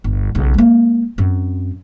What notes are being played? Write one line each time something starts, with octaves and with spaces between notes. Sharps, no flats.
G1
B1 C#3
G#3 A#3
F#2 C4